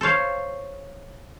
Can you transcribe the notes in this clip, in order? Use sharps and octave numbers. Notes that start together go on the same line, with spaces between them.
A4 C5 C#5 F5